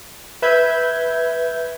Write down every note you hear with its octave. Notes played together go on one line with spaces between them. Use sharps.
B4 E5 G6 G#6